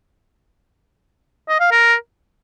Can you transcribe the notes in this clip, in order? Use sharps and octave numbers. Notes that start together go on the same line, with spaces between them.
D#5
F5
A#4